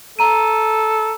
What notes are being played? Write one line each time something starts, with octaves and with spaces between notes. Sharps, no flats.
A4 A#5 D#7